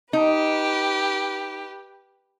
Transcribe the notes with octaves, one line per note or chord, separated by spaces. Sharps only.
D#4 G4 B4